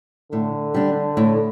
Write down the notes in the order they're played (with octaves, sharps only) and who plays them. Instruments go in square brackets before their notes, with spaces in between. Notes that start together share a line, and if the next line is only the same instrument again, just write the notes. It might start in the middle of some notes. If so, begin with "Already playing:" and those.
[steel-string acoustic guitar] A2 [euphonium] D3
[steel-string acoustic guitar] G3 D4
A2